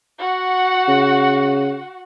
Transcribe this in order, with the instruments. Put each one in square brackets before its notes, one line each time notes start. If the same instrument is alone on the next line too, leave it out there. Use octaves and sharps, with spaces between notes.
[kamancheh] F#4 F#5
[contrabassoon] C#3